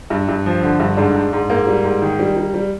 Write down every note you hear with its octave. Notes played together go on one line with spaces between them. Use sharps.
G2
G2
F3
D3
G2
G#2 D4
G#2
G#2
G#2 A#3
G3
G#2
D#3
G3
G3
G3